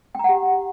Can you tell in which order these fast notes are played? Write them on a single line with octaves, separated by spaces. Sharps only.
G5 A#5 F#5 G4